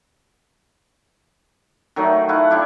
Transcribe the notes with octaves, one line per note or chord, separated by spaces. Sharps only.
D#3 F#3 A3 D#4
E4 A4 F5 F#5
D4 E4 G4